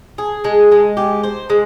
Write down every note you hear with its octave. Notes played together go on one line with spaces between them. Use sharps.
G#4
G#3
G#3
G4
C5
G#3